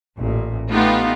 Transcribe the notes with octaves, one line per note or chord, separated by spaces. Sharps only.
A1 A#2
A3 B3 D#4 F4 G4